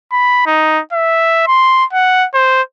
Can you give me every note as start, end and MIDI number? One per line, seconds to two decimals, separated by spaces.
0.12 0.44 83
0.46 0.81 63
0.93 1.47 76
1.47 1.85 84
1.93 2.26 78
2.34 2.62 72